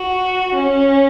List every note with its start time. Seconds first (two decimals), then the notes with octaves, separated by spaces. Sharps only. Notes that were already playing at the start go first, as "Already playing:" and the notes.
Already playing: F#4
0.55 C#4